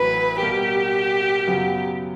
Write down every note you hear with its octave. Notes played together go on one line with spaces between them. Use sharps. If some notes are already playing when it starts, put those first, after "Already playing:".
Already playing: A1 A2 F#3 B4
B2 G3 A#3 G4
F#2 C#3 F#3 B3